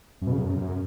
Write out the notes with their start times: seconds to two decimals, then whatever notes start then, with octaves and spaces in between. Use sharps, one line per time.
0.21 F#2
0.27 B2
0.32 C#3
0.38 F#2